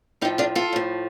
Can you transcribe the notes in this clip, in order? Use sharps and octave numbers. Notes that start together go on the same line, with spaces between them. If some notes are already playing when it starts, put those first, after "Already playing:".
A2 F3 D#4 G4
D4 F4
F4 A4
A2 F3